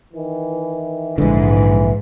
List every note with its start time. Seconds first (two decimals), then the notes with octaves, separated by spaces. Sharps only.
0.14 D#3 E3
1.18 A#1 G#2 D3 E3